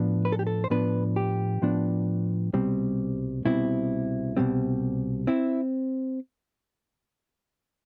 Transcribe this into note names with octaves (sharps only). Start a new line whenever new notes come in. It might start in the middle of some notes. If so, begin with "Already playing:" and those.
Already playing: A2 F3 B3 D4
B4
A4
G4
A4
C5
A2 F3 B3 D4 B4
G4
A2 F3 B3 D4
C2 B2 G3 C4
C2 B2 G3 C4 E4
C2 B2 G3 C4
C4 E4